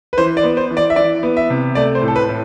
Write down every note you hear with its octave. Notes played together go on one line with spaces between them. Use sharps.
B4
E3 C5
D5
B3
C5
E3
D5
E5
E3 D5
B3
E5
C3
A3 D5
C5
A2
A4
B4
A2